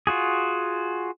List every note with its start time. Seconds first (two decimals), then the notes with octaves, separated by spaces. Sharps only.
0.07 F4 F#4 G#4